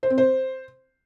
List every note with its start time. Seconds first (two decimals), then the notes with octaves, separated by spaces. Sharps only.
0.03 C5
0.10 C4
0.18 C5